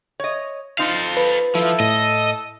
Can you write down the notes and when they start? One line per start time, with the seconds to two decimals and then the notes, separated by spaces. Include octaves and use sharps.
0.20 C#5 D#5
0.79 C4 D#4 F4 A4 F5
1.17 B4
1.55 F3 E4 A4
1.80 A2 D#5